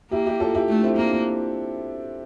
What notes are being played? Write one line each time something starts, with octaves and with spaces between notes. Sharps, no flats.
A#3 E4 G4
E4 G4
F4 A4
E4 G4
A3 D4
C4 E4
A#3 D4
D4